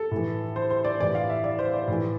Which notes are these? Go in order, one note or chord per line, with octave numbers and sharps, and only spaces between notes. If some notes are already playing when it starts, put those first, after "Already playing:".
Already playing: A4
A2 E3
C5
C5
D5
A2 E3 D5
F5
E5
D5
C5
D5
A2 E3